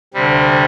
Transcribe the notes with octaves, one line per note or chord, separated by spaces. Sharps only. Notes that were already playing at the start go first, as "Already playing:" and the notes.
D2 C3 G3